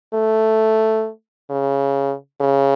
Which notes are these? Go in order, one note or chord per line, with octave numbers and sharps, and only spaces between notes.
A3
C#3
C#3